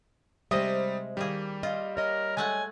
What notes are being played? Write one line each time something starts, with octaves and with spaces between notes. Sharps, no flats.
C3 G3 G#3 C5 D#5 E5 G#5 D#6
D#3 G3 A#3 G#4
F4 D#5
A#4 C#5 D#5
G#3 A3 F#5 G#5